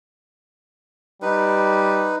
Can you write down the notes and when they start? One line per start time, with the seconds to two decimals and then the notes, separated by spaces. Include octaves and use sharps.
1.22 G3 D#4 B4